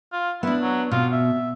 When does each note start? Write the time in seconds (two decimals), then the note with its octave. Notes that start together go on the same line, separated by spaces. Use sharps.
0.13 F4
0.43 B3 D4 E4
0.62 F#3
0.91 B2 F4
1.12 E5